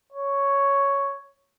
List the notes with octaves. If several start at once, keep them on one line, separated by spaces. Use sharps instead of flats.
C#5